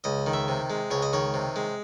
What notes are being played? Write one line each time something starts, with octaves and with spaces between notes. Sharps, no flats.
C#2 D#5
D#3
E5
C3
G#3
C#2 C#5
D#5
D#3 C#5
C3
G#3